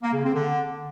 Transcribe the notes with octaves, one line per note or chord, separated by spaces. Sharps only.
A#3
C#3
C4
D3